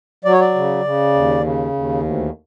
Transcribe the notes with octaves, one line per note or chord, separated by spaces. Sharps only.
F#3 D5
C#5
D5
C#3
C#3
D#2
C#3
D#2
D2